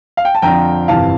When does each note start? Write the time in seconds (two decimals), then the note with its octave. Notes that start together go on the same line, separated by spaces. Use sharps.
0.17 F5
0.25 G5
0.35 A5
0.42 F2 D3 F3 G5 A#5
0.88 G1 F2 C3 E3 F5 A5